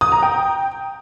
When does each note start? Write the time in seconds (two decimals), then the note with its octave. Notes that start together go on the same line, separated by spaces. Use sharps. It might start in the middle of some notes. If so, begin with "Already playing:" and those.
0.01 D#6
0.12 A#5
0.23 G5